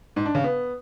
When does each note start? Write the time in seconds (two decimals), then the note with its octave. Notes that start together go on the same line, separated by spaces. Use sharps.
0.16 G#2
0.26 D4
0.35 C#3
0.44 B3